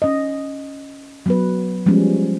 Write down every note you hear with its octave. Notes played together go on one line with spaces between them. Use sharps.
C#4 D#5
F#3 B3 B4
F3 G3 G#3 B3 C#4